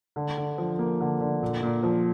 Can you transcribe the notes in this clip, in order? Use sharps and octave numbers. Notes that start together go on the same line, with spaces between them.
D3
D3
F3
A#3
D3
D3
A#2
A#2
F3